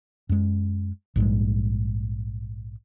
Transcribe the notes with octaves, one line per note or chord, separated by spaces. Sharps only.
F#2 G#3
A#1 G#2 G3 G#3